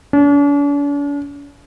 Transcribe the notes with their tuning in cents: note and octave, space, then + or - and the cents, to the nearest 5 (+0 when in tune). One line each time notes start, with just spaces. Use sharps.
D4 -45